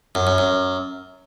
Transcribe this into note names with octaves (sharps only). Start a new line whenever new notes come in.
F#2
F#2
F#2